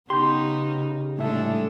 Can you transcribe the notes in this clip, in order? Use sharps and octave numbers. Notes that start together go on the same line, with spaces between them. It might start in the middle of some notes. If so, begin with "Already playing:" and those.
C#3 B3 D#4 G4 C6 G6
C2 A2 G#3 A3 D4 A4 E5